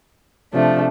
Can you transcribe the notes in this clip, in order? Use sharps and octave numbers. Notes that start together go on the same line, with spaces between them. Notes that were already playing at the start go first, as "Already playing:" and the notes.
C3 F3 A3 D4